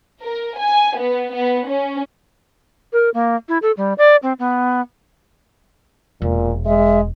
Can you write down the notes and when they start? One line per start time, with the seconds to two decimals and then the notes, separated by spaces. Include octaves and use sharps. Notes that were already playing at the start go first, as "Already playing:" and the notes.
0.23 A#4
0.59 G#5
0.98 B3
1.35 B3
1.69 C#4
2.93 A#4
3.14 A#3
3.49 E4
3.62 A4
3.77 G3
3.98 D5
4.23 C4
4.39 B3
6.22 E1 A#2
6.66 G#3 E5